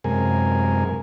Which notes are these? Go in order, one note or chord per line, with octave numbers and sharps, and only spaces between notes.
F#2 C3 G#3 A#4 G#5